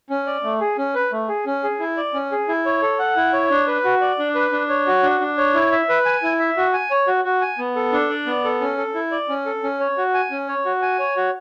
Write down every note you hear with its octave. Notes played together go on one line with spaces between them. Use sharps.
C#4
D5
A3
G#4
C#4
B4
A3
G#4
C#4
G#4
E4
D5
C#4
G#4
E4
C#5
A4
F#5
E4
C#5
D4
B4
F#4
D5
D4
B4
D4
C#5
F#4
D4
D4
C#5
E4
E5
B4
G#5
E4
E5
F#4
G#5
C#5
F#4
F#4
G#5
B3
A4
D4
D5
B3
A4
C#4
A4
E4
D5
C#4
A4
C#4
C#5
F#4
G#5
C#4
C#5
F#4
G#5
C#5
F#4